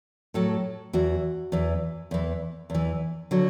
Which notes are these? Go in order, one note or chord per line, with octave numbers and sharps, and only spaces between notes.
A2 F#3 A4
E2 E3 F#4
E2 E3
E2 E3
E2 E3
D3 F#3